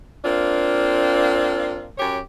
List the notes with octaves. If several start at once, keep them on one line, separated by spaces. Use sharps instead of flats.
A#3 C4 D4 F4
F#2 G4 C#5